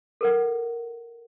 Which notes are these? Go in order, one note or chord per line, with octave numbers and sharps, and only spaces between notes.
A4 A#4 F#5